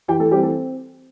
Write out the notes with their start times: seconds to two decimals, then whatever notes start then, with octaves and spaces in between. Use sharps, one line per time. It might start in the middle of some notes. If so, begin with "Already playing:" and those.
0.08 E3 G4 G5
0.20 A3 A4
0.31 G3 C4 G4
0.43 A3 A4